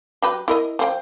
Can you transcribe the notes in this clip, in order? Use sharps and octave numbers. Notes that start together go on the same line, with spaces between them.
F#3 G4 B4
E4 A#4 D#5
F3 C4 G5